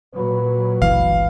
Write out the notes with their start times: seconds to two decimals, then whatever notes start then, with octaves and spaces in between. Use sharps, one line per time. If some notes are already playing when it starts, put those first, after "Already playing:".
0.15 A#2 F#3 B4
0.82 G1 C#2 E3 F5